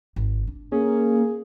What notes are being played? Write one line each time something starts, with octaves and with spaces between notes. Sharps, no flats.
G#1
D4
A#3 C#4 G#4